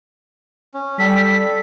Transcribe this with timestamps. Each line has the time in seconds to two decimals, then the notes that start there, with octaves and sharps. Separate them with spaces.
0.74 C#4
0.99 G3 A4 B6